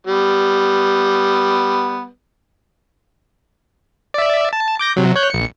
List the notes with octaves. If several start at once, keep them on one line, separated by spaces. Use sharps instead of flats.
G3 B3
D5 E5
A5
D6 G6 A#6
C3 F#3
C#5 F#6 G6
A#1 C#7